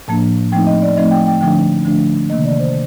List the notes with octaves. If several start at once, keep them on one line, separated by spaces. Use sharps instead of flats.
A2 F3 A#3 D4 A5
F3 A3 C4 D#4 G5
D#5
D5
F3 A3 C4 D#4 D#5
G5
G5
D3 F3 A3 D4 G5
D3 F3 A3 D4
C3 D#3 A#3 D#5
D5
C5